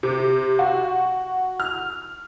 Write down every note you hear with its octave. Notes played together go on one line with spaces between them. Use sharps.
C3
F#4
F6